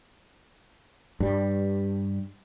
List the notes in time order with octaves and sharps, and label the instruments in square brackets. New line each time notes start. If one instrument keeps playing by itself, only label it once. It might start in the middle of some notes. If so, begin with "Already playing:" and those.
[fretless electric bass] G2 G3